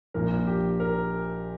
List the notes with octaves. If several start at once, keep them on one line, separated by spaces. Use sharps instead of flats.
A#1 A#2 F3 A#4
G4
A#4